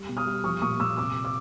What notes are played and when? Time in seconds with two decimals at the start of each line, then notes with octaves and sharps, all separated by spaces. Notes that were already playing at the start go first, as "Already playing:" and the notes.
Already playing: G3
0.09 B2
0.17 D#6 F6
0.26 G3
0.44 F3 C#6 D#6
0.62 A#2 C#6 D#6
0.80 A#2 D6 E6
0.97 C3 D6 E6
1.25 D6 E6